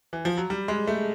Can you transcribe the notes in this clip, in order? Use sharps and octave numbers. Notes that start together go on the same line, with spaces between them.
E3
F3
F#3
G3
G#3
A3